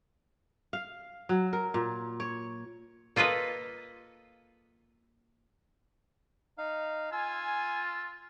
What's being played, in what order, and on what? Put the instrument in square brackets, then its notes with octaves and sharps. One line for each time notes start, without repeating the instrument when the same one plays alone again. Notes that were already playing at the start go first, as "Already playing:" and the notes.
[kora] F5
F#3
A#4
A#2
C#5
[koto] A#3 F4 A4 B4 D#5
[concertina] D#4 F5
[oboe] F4 [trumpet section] G#5 [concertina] E6